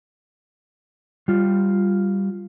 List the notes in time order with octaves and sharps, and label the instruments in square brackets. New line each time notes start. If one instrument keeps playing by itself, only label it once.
[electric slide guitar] G3 F4